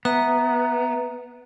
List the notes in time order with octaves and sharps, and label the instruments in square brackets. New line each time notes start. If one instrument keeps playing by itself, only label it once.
[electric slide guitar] B3 [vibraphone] B4 E5 A#5